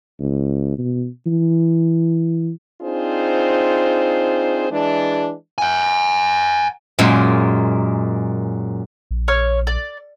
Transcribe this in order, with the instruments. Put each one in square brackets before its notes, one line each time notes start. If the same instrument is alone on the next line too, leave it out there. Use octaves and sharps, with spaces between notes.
[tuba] C#2
B2
E3
[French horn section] C4 D4 D#4 F4 G#4 C5
E3 G#3 D4
[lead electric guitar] F#5 G#5
[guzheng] F#2 A#2 G#3 A#3
[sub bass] A#1
[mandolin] C#5 F6
D5